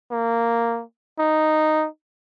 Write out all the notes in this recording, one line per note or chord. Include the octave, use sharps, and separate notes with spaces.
A#3
D#4